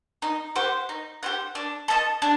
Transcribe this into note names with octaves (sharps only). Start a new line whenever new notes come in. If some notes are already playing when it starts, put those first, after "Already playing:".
D#4
G4 C5 F#5
D#4
G4 C5 F#5
D4
A4 D#5 A5
D4